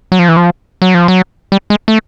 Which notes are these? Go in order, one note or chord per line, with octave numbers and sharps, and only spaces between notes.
F#3
F3
E3
F3
F#3
F3
F#3
G3
G#3
A3